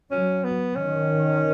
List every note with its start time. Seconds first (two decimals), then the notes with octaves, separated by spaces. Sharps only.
0.11 F#3 C#4
0.44 B3
0.75 D#3 C#4